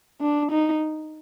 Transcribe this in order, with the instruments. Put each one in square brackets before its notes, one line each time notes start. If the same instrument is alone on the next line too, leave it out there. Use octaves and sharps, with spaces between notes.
[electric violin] D4
D#4